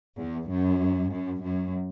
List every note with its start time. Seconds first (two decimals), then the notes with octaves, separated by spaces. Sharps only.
0.18 E2
0.49 F#2
1.12 F#2
1.43 F#2